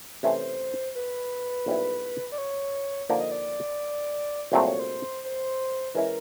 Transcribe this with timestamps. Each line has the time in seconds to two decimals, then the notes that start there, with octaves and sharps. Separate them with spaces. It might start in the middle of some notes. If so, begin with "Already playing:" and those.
0.23 C3 E3 A3 C#4 C5
0.95 B4
1.66 B1 A#2 G3 C4 E4
2.32 D5
2.38 C#5
3.09 D3 F3 A#3 D#4 D5
3.20 D#5
3.31 D5
4.52 C2 A#2 F#3 A3 C4 C5
4.66 C#5
4.80 C5
5.24 C5
5.95 E3 G#3 C#4 E4 A#4